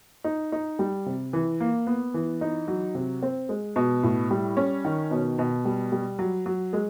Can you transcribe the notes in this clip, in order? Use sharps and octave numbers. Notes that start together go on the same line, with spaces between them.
D#4
D#4
G3
C3
E3
A#3
B3
E3
D#4
F#3
C3
C4
G#3
B2
A2
G3
C#4
D#3
B2
B2
G3
G3
F#3
F#3
G#3